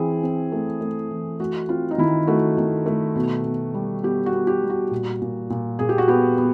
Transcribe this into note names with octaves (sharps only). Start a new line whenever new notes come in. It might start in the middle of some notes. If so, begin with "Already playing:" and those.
Already playing: E3 C4 G#4
C4
A3
A3
E3
A3 F#4
C4 F4
D#4
D#3 E4
A3 F#4
D#3
A3
B2
B2
G3
B3 G4
F#4
B3
G4
G3
F#4
A#2
A#2
A#2
A#2 G#4
G4
F#4
B3 G4
B3